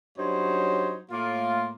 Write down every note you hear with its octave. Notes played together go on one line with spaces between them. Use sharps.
G2 F#3 C#4 D#4 C5 C#5
A2 A#3 F4